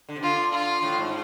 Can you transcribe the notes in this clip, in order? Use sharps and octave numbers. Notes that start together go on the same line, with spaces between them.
D3
C3
D3 F4
F4
A2
G#2